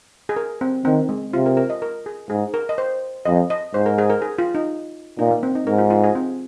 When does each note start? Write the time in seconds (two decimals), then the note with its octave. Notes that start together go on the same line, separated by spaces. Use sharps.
0.29 G#4
0.36 A#4
0.61 C4
0.85 D#3 C4
1.09 G#3
1.33 C3 F4
1.46 A#4
1.57 A#4
1.70 D#5
1.82 A#4
2.06 G#4
2.30 G#2 G#4
2.54 A#4
2.69 D#5
2.78 C5
3.25 F2 D#5
3.50 D#5
3.74 G#2 C5
3.86 A#4
3.98 G#4
4.10 A#4
4.22 G#4
4.39 F4
4.55 D#4
5.19 A#2 D#4
5.31 A#3
5.43 C4
5.55 D#4
5.67 G#2 A#4
5.78 F4
5.90 F4
6.04 G#4
6.15 C4